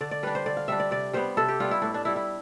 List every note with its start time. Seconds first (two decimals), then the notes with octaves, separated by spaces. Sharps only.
0.01 D3 D5
0.11 D5
0.23 G3 D4 B4
0.35 C5
0.46 D3 D5
0.57 F5
0.68 G3 D4 E5
0.80 D5
0.91 C3 D5
1.13 G3 B3 C5
1.37 C3 A4
1.48 G4
1.60 G3 B3 F4
1.71 E4
1.82 A2 D4
1.94 D4
2.05 G3 D4 E4
2.16 E4